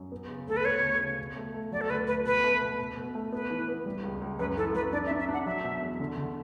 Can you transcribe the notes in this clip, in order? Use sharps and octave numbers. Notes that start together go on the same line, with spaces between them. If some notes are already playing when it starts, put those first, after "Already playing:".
Already playing: F#2
B3
C#3
D2 A4
B4
B3 C#5
D2
C#3
B2
A3
A3
F#3 D5
A4
D2 B4
D2 B4
B2 B4
A3
B2
B2
B2
A3
B3 B4
E3
B3
G3
C#2
C#2
F#2 B4
E3 A4
F#2 B4
D4 D5
E5
D4
E5
D4 F#5
F#3 E5
B2
E2
D3
D3